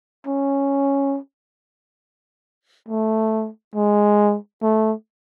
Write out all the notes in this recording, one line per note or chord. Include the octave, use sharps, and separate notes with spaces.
C#4
A3
G#3
A3